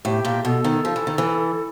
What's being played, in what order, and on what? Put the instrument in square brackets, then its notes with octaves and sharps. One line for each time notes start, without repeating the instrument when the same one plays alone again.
[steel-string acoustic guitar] A2 [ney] G4
[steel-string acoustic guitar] A#2
[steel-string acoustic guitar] B2 [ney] A4
[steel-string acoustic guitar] D#3
F3
E3
D#3
E3